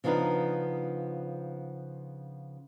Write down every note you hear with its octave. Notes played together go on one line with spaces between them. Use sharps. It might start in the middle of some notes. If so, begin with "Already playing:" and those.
C#3 F3 B3 D4 D#4 B4